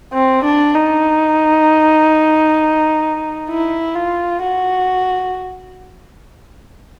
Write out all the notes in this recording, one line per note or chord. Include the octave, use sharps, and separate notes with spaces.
C4
D4
D#4
E4
F4
F#4